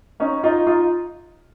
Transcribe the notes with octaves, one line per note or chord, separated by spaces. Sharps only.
C#4 D#4
D#4 F4
D#4 F4